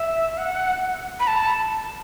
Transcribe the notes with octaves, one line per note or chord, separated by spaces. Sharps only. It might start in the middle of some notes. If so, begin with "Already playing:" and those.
Already playing: E5
F#5
B5
A5